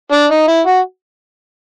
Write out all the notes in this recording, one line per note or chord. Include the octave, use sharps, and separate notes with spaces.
D4
D#4
E4
F#4